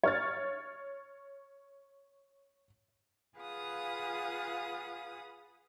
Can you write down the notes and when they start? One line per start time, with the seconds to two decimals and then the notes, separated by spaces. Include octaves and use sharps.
0.04 C#5 F6 A6
3.36 F4 G#4 B4 F5 F#5 D#6